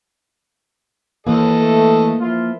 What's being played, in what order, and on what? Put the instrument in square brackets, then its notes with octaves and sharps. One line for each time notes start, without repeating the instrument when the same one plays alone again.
[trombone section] D#2 [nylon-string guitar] E3 [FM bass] A#3 [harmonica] A4 D#5
[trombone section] A3
F3 E4 F4